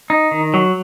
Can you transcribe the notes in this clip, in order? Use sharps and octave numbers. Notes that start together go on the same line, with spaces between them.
D#4
D#3
F#3